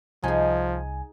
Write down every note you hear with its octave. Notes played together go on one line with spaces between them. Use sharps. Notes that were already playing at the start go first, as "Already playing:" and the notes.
C2 F3 D#4 G#4 G#5